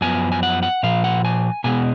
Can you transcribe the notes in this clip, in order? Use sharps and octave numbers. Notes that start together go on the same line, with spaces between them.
F#2 F3 B3 G#5
G#5
F#5
F#5
A#2 F3 F5
F#5
G#5
B2 G#3 B3 G#5